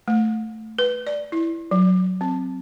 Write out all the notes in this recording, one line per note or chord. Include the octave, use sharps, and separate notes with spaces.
A3
B4
D5
E4
F#3
C4